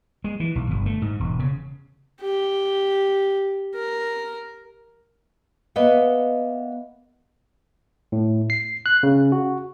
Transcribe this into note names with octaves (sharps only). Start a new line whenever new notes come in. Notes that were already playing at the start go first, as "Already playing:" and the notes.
G#3
E3
B1
G1
A3
G#2
E1
C#3
G4
A#4
A#3 B3 D#5 E5 F#5
A2
C7
F#6
C#3
F#4